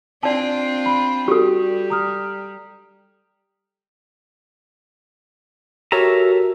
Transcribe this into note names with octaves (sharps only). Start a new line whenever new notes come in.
C4 D4 F4 D5 A5
B5
G3 F#4 G4 A4
A#5 D#6 F6
F#4 G4 A4 A#4 C#5 E5 A#5